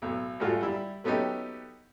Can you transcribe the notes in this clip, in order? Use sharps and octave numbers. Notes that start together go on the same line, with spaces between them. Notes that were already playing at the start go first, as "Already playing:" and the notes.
B1 A2
G#2 G3 A3 F4 F#4
G3 E4
F#3 A3 B3 C#4 D#4 G4